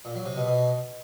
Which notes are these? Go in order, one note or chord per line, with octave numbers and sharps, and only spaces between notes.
A#2
F#3
C3
B2
B2